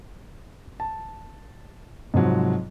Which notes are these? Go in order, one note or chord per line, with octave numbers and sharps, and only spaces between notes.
A5
G#2 C3 F3 F#3